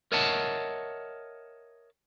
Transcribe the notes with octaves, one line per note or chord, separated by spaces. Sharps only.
A#4 C#5 D#5 E5 F#5 A5